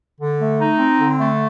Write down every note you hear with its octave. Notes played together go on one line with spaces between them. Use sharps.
D3
A3
D#4
C4
D3
A3